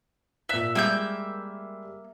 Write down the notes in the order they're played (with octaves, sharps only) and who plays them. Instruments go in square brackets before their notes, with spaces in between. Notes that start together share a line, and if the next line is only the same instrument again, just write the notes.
[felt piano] A#2 F#6 [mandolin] E5
[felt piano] G3 G#3 [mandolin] A#3 E5 G6